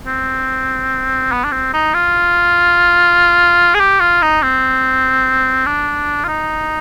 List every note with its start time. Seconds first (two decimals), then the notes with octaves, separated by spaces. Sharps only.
0.07 C4
1.32 B3
1.44 D4
1.52 C4
1.74 D#4
1.94 F4
3.75 G#4
3.80 G4
4.00 F4
4.22 D#4
4.43 C4
5.66 D4
6.24 F4
6.28 D#4